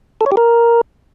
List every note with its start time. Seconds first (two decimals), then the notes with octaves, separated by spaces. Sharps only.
0.21 A4
0.26 C#5
0.32 G4
0.37 A#4